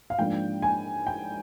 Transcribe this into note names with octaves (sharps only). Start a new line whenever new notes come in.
F5
G#2 F3 A#3 D4 G5
G#5
G5